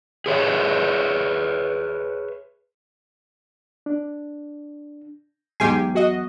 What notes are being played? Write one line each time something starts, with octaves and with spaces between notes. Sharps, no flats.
G#4 B4 C#5 E5
D4
E2 G#2 F#3 B3 G4 G#5 C7
F#4 D#5